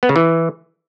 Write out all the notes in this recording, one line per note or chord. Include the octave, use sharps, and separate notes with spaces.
B3
C#3
E3